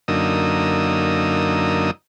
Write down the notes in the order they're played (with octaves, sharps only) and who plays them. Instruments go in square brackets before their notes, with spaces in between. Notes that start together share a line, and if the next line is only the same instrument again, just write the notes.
[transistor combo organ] F#2 D3 A#3 D#4 D#6 E6